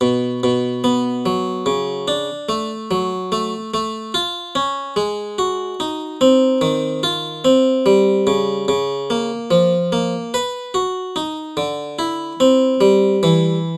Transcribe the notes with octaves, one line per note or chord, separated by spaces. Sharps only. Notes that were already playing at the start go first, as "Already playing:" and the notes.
B2
B2
B3
F#3
C#3
D4
A3
F#3
A3
A3
F4
C#4
G#3
F#4
D#4
C4
D#3
F4
C4
G3
C#3
C#3
A#3
F3
A#3
B4
F#4
D#4
D3
E4
C4
G3
E3